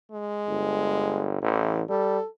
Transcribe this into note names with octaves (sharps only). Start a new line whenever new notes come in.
G#3
G1
A1 E3
G3 A4